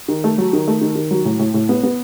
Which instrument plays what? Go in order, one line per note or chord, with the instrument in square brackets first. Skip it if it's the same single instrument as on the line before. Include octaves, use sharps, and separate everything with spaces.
[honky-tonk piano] D#3
A3
F#3
D#3
A3
D#3
D#3
F#3
A2
A2
A2
B3
B3